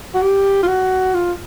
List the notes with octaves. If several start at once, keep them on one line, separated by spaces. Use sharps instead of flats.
F#4
G4
F4
F#4
F4